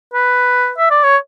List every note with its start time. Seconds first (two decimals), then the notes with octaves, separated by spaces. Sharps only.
0.14 B4
0.78 E5
0.91 D5
1.03 C#5